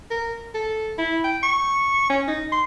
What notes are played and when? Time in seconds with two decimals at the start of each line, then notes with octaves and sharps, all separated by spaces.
0.11 A#4
0.54 A4
0.98 E4
1.24 G5
1.43 C#6
2.10 C#4
2.28 D#4
2.52 C6